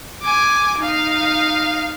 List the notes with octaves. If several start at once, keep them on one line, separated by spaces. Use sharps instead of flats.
G#5 D6
D#4 F5